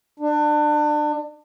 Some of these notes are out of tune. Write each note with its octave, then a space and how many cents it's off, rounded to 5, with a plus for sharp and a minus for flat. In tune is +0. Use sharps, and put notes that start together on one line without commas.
D4 +30